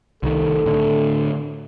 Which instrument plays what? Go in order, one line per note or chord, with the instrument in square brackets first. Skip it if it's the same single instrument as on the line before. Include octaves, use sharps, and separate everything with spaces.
[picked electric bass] C2 D#3 [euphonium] A4
[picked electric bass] A2 D3